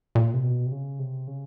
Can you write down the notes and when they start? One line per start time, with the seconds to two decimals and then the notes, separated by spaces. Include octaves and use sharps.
0.15 A#2
0.34 C3
0.43 B2
0.66 C3
0.72 C#3
1.00 C3
1.27 C#3